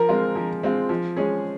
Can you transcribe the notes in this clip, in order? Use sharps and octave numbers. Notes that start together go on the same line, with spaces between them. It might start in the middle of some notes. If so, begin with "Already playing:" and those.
Already playing: F3 A#4
G#3 C4 F4
F3
G#3 C4 F4
F3
G#3 C#4 G#4